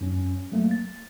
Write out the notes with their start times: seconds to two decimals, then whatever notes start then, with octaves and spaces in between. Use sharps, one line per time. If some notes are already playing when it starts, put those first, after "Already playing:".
0.01 F#2 C#4
0.52 F#3 A3 A#3
0.71 A6